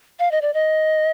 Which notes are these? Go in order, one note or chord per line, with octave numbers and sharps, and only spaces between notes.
F5
D#5
D5
D#5